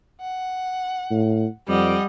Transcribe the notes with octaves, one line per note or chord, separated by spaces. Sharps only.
F#5
A2
F2 G3 D#5 F#5